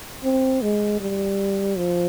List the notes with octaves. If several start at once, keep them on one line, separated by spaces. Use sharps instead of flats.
C4
G#3
G3
F3